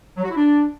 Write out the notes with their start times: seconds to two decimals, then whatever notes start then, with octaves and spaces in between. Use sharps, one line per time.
0.17 F#3
0.23 F#4
0.30 E4
0.36 D4